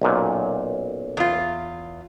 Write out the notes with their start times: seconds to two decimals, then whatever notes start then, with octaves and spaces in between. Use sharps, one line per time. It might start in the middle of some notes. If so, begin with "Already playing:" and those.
0.01 B1 F#2 A#2
1.17 E2 F4